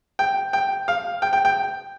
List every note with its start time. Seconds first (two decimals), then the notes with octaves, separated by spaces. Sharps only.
0.19 G5
0.53 G5
0.88 F5
1.22 G5
1.33 G5
1.45 G5